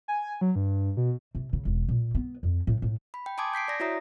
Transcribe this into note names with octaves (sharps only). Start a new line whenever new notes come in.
G#5
F#3
G2
B2
C3
C#3
E1
A#2
B3
F2
A2
A2
B5
G5
G#5 A5 C6 D6 D#6 G#6
G6 B6 C7 D7
D5 A#6
E4 F#4 C#5 E5 A#5 D#6